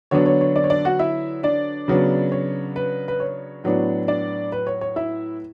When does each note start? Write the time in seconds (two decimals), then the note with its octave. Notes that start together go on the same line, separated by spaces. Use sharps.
0.11 D3 F#3 B3 D4 C#5
0.26 C#5
0.41 C#5
0.56 D4 D5
0.64 C#5
0.70 D4 D5
0.85 F#4 F#5
0.99 E4 E5
1.43 D4 D5
1.88 C#3 F#3 B3 D4
2.32 C#5
2.76 B4
3.08 B4
3.20 C#5
3.64 A2 F#3 B3 D4
4.08 D4 D5
4.52 B4
4.67 C#5
4.81 C#5
4.96 E4 E5